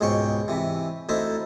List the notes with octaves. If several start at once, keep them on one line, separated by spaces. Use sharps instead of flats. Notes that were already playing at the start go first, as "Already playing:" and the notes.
C#2 G#2 B2 C5 G5 C#6
C3 E3
D2 D#4 E4 C5 A5